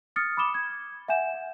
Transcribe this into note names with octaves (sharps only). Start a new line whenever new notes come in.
D#6 F6 A6 C#7
B5 D6 D#6 E7 G7
G#6
E5 F#5 G#5 G6 E7
F#5